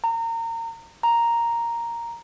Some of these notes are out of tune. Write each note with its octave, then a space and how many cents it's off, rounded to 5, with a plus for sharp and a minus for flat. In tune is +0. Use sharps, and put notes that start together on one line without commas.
A#5 -30
A#5 +0